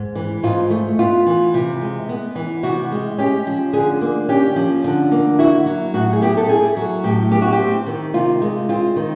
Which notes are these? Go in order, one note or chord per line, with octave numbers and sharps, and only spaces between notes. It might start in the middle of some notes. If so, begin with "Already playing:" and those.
Already playing: G#2
E3
G#2 F4
A3
B3 F4
E3
C3
G#3
B3
E3
C3 F#4
G#3
C#4 G4
F3
D3 G#4
A#3
C#4 G4
F3
D3
A#3
E4 F#4
F#3
A2 F#4
G#4
B3 G4
A4
E4 G#4
F#3
A2 G4
B3 G4
F#4
G4
C4
D#3
C3 F4
G#3
C4 F4
D#3